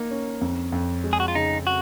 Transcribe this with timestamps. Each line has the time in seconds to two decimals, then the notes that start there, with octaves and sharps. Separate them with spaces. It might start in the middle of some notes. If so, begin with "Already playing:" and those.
Already playing: A#3 D#4
0.11 C#4
0.41 F2
0.72 F2
1.04 G#3
1.13 G#4
1.20 F#4
1.28 F4
1.35 C#3 D#4
1.67 F#4